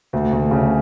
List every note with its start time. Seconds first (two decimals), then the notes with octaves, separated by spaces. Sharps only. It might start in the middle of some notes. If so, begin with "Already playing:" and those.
0.13 D2
0.32 D2
0.51 C#3